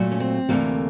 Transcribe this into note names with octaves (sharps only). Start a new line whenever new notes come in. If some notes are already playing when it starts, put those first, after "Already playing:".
Already playing: A#2 F#3 A3
C#4
C4
D2 C3 E3 A3 A#3